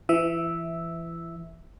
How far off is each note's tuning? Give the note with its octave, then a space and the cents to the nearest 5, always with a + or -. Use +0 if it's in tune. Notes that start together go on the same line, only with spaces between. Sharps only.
E3 +30 E5 -5